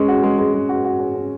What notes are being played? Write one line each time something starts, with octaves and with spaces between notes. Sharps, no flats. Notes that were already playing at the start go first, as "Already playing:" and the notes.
Already playing: G#3 C#4
F#4
G#3
G#3
G#3
F#4
F#4
C#4
C#4